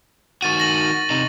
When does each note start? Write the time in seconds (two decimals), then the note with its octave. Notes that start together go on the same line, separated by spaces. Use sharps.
0.42 D#3 F#4 C#6 A6 D#7
0.60 A#6 F#7
1.10 C3 D#4